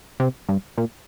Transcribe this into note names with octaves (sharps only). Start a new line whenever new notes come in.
C3
G2
A#2